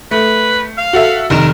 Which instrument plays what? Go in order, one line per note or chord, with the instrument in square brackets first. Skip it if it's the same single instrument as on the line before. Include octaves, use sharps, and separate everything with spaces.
[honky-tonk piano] A3 [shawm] B4
[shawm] F5
[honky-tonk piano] F#4 A4 E5
[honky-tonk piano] F1 D#3 E7 [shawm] A#4